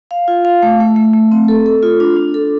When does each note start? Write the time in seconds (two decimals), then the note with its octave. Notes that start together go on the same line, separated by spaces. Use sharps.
0.11 F5
0.28 F4
0.45 F5
0.62 A3
0.80 A3
0.96 A3
1.13 A3
1.32 C4
1.48 A4
1.66 A4
1.83 F4
2.00 D4
2.16 D4
2.34 A4